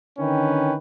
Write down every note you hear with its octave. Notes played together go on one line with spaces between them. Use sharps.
D3 D#3 C#4 B4 G5